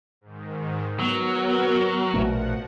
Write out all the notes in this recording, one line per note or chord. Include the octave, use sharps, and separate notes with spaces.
G#2 D#3
F#3 B3 F#4 A#4
A#1 B2 F3 A3 F#5